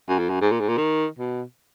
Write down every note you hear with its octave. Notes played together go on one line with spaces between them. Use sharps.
F#2
F2
F#2
G#2
A#2
G#2
A#2
D#3
B2